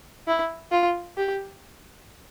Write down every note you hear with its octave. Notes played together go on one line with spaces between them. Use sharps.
E4
F4
G4